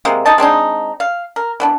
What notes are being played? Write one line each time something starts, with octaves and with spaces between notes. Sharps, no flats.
C3 G#3 A#3
D#4 D#5 A5
G#3 C4 D4 D#4
F5
A#4
E3 B3 D4